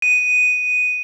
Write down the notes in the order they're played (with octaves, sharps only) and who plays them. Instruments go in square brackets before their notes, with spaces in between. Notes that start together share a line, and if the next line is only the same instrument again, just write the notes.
[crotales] D#7